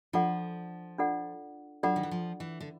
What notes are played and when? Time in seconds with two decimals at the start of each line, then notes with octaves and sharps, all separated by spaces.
0.13 F3 D4 F4 A4 D5 F#5
0.98 D4 F4 A4 D5 F#5
1.83 F#3 D4 F4 A4 D5 F#5
1.96 D#3
2.03 E3
2.11 F3
2.40 E3
2.61 D3